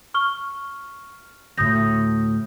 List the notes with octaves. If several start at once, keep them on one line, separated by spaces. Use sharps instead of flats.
C#6 F6 G7
D2 A2 D#6 G6 A#6